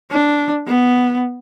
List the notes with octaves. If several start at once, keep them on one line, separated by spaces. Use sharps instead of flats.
D4
B3